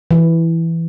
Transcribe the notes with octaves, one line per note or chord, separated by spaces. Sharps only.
E3